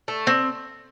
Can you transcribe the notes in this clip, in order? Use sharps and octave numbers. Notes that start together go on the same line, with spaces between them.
A3
C4